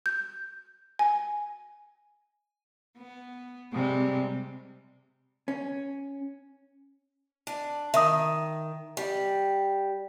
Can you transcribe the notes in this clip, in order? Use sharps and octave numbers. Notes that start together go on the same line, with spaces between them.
G6
G#5
B3
C3 G3 G#3
C#4
D4
D#3 E5 D#6
G3